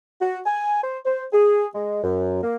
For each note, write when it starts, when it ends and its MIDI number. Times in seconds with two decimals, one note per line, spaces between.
0.21 0.39 66
0.46 0.80 80
0.83 0.98 72
1.05 1.24 72
1.33 1.66 68
1.75 2.01 56
2.03 2.40 42
2.43 2.56 58